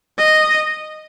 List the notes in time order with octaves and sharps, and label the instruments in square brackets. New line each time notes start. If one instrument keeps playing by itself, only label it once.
[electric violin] D#5